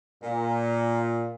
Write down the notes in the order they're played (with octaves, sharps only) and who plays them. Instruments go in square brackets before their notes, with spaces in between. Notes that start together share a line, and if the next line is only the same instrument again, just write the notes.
[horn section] A#2